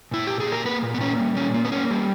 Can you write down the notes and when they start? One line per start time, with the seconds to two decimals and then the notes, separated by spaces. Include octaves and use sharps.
0.11 A#2 E4
0.27 A#2 G4
0.40 G#4
0.47 A#3
0.52 A#4
0.65 A#3 B4
0.83 A#2
0.94 B3
1.01 A#3 C#4
1.19 G3
1.36 A#2 C#4
1.54 A#3
1.65 B3
1.72 A#3 C#4
1.91 G3